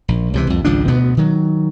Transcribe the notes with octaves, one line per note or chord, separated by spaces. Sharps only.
A#1
C#2 C3 E3
C2 F2
G#1 C#2 F3 D4
D2 B2 B3
D#3 F#3